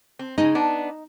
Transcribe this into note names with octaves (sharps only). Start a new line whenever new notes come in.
C4
C#3 G#3 D#4
B3 D4